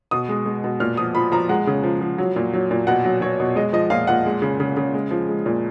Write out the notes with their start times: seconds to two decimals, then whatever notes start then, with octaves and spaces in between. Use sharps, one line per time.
0.11 B2 D#6
0.29 G#3
0.46 G#3
0.64 B2
0.80 A#2 F6
0.97 F3 D#6
1.15 F3 B5
1.32 F3 A#5
1.49 G#3 F#5
1.67 C#3
1.83 F3
2.01 F3
2.18 F#3
2.36 A#2
2.53 F#3
2.71 A#2
2.87 B2 F#5
3.05 F#3
3.21 F#3 C#5
3.40 B2
3.56 G#3 D#5
3.73 F3 D#5
3.90 A#2 F5
4.07 A#2 F#5
4.26 G#3
4.42 C#3
4.60 C#3
4.77 C#3
4.94 G#3
5.11 F3
5.29 G#3
5.46 A#2